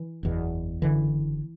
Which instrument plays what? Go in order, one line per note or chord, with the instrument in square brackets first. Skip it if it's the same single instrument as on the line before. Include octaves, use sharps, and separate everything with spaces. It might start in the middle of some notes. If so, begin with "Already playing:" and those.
Already playing: [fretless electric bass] E3
F#1 E2 B2
F#1 F#2 D3 E3